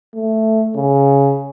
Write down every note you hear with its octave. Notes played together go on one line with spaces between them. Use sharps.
A3
C#3